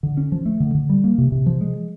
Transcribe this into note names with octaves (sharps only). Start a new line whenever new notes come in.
D3
C#4
F3
A3
D3
D3
G3
A#3
C3
C3
F3
G#3